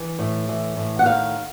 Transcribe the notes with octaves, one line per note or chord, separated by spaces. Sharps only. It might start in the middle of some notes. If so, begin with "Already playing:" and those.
Already playing: E3
A2
E3
A2
F#5
D#3 F5